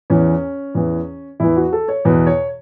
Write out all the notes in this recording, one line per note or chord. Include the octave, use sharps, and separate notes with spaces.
E2 E3 C#4
E2 E3
E2 E3 E4
F#4
A4
C#5
E2 B2 B4
C#5